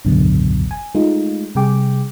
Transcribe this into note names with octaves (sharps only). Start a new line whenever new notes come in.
G#1 C#2 F#2 B2 D3 F#3
G#5
G#3 A3 D#4 F4
C3 G3 G#4 G5 D6